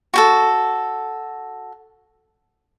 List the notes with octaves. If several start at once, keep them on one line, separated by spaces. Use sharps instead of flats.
F#4 G4 A4